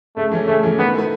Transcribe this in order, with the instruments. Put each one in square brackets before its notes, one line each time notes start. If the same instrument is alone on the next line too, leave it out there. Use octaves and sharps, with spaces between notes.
[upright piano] C#3 [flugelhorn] A3
[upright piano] E3 A3 C#4
[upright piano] C#3 [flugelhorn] A3
[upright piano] E3 A3 C#4
[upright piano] D#3 [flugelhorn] B3
[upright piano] A3 E4 B4